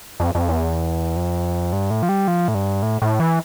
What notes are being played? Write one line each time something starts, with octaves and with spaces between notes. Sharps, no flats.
F2
F2
E2
F2
G2
A2
F3
G3
F3
A2
G2
A2
A2
E3